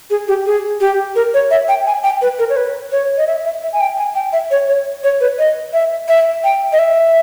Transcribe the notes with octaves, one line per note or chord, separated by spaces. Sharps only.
G#4
G4
G#4
G4
A#4
C#5
E5
G5
G#5
G5
B4
A#4
C#5
B4
C#5
D#5
E5
E5
E5
G#5
G5
G#5
G5
E5
C#5
C#5
C#5
B4
D#5
E5
E5
G5
D#5
E5